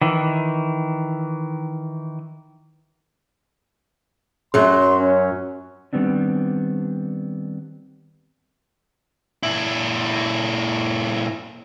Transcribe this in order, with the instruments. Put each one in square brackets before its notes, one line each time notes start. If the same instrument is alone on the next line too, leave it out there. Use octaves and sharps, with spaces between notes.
[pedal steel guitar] D#3 E3
[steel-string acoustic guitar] F#2 F#3 [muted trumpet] C6
[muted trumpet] C#4
[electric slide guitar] D#3 G3 B3 C4 D4
[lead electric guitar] A#2 E4